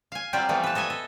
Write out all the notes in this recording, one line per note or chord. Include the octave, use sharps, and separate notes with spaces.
F5 G#5
F#3 G3 C4 F4 G4 D5
E3 F3 G3 A3 B3
B4 A5
A4 D#5 E5 G#5
A4